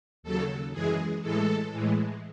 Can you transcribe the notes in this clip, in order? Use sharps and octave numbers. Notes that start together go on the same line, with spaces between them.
D#2 C#3 F#3 A4
F#2 E3 G#3 G#4
A2 E3 G#3 A4
A2 E3 G#3